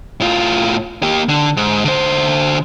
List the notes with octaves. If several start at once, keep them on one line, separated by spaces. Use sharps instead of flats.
A2 F4
A#3 G4
D3
G#2
D3 C5